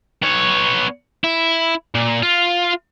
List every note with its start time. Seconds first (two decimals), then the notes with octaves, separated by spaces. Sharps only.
0.22 B3 C#5
1.24 E4
1.95 A#2
2.22 F4